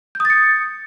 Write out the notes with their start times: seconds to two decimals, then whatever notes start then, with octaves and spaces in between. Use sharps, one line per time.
0.15 G6
0.20 D#6
0.25 A6
0.30 C#7